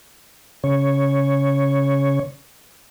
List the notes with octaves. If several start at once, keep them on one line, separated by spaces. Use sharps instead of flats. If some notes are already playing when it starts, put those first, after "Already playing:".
C#3 C#5